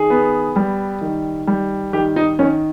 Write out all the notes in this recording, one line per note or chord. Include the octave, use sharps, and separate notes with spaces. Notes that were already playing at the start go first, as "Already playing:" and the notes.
Already playing: D#3 G#4
B3
G3
D#3
G3
D#3 G4
D#4
D#3 C#4